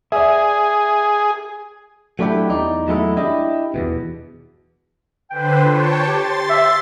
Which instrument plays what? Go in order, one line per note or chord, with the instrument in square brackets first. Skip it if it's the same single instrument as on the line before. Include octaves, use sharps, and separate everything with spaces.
[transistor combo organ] G#4 [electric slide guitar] D5 E5
[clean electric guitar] F#3 A3 D4 E4 G4
E2 D#4 D5
E2 F#3 G#3 A3 E4
D4 E4 G4 D#5
E2 G#2 B2
[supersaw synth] D3 B4 C5 [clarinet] G5
[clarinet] F4 [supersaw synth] C#5 G5 A5
[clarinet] G4 [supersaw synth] C6 A6
[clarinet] E5